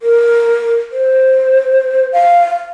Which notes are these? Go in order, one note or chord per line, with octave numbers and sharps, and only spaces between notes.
A#4
C5
F5